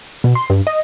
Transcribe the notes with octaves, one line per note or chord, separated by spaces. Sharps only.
B2
C6
G2
D#5